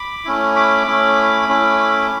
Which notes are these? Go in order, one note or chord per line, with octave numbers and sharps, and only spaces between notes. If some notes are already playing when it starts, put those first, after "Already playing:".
Already playing: B5 D6
A3 C#4 E4
B5 D6
A3 C#4 E4
A3 C#4 E4